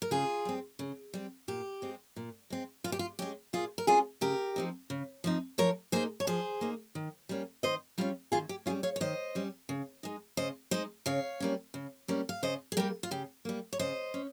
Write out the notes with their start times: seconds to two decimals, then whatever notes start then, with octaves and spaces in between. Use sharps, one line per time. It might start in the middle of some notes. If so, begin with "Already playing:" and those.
0.02 A#4
0.11 C#3 F4 G#4
0.45 G3 C4
0.79 C#3
1.14 G3 C4
1.48 A#2 G4
1.82 G#3 C4
2.16 A#2
2.50 G#3 C4
2.84 A#2 F4
2.92 G4
2.99 F4
3.19 G#3 C#4 G4
3.53 A#2 F4 G#4
3.78 A#4
3.87 G#3 C#4 F4 G#4
4.21 C#3 G4 A#4
4.56 F3 C4 D#4
4.90 C#3
5.24 F3 C4 D#4
5.58 F3 A#4 C#5
5.92 A#3 D#4 G#4 C5
6.20 C#5
6.27 F3 G#4 C5
6.61 A#3 D#4
6.95 D#3
7.29 G3 A#3 C#4
7.63 D#3 C5 D#5
7.98 G3 A#3 C#4 F4
8.32 D#3 F4 G#4
8.49 G4
8.66 C#4 F4 G#4
8.70 G3
8.83 C#5 F5
8.96 C#5
9.01 D#3 C5 D#5
9.35 G3 C#4
9.69 C#3
10.03 G#3 D#4
10.37 C#3 C5 D#5
10.71 G#3 D#4 C5 D#5
11.06 C#3 C#5 F5
11.40 G3 A#3 C#4
11.74 C#3
12.08 G3 A#3 C#4
12.29 F5
12.43 C#3 C5 D#5
12.72 G#4
12.77 G3 A#3 G4 A#4
13.03 F4
13.11 C#3 G4
13.45 G3 A#3
13.73 C#5
13.79 C#3 C5 D#5
14.14 C#4